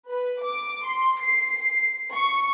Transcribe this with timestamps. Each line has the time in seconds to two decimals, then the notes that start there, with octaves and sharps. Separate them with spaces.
0.10 B4
0.42 D6
0.85 C6
1.23 C7
2.14 C#6